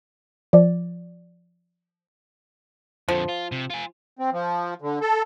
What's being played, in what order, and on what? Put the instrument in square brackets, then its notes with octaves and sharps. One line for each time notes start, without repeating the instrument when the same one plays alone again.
[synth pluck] F3 D5
[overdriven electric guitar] F2 D3 [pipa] F3
[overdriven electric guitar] F4
C3
F4 G#5
[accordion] C4
F3
D3
A4